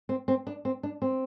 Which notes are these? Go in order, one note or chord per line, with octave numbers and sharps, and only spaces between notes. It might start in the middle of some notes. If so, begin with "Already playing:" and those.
C4
C4
D4
C4
D4
C4